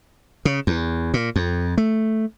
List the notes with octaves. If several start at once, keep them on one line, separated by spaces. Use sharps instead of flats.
C#3
E2
A#2
F2
A3